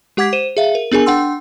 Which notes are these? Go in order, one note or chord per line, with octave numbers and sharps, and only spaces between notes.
G#3 G4 F#5 D6 G#6 B6
C5 D#7 E7
G#4 E5 F5
A#4
B3 D4 G#4 A#4 G#5
D4 F#5 G5 C6 E6